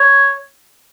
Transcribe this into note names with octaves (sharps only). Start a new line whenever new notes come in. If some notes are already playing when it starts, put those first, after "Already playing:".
Already playing: C#5